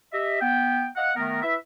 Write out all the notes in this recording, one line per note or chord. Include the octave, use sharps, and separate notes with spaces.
G4 D#5 E5
B3 G5
D#5 F5 F#5
D#3 A3 B3 A#4
E4 B4 E5